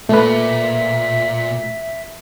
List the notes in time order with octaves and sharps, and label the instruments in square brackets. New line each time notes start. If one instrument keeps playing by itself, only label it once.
[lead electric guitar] A#2 [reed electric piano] A3 B4 [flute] E5